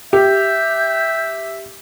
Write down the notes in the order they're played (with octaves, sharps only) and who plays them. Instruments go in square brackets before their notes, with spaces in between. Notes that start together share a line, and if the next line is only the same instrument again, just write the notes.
[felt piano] G4 [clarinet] E5 [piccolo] G6